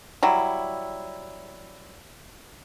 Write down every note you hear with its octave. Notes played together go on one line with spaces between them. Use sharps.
F#3 G3 E4